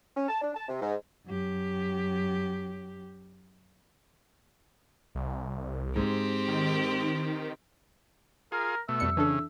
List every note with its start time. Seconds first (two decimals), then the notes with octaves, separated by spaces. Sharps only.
0.16 C#4
0.28 A5
0.41 D4
0.54 A5
0.68 C3
0.81 G#2
1.27 F#2 G4
5.15 C2
5.96 G#2 C4 G4
6.48 D#3
8.52 F4 G#4 A#4
8.89 B2 A3 E5
9.00 F2 G3 C#7
9.17 C#3 E3 D4 A4